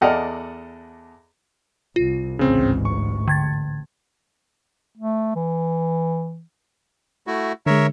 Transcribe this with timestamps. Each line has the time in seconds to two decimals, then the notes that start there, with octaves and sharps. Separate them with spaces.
0.01 E2 A4 D5 D#5 F#5 F6
1.96 C2 F4
2.39 A1 D2 G#2 C#3 C4
2.85 C#6
3.28 D3 G#6 A6
4.97 A3
5.35 E3
7.27 A3 E4 F#4
7.66 D3 G#3 A#4 C#5 E5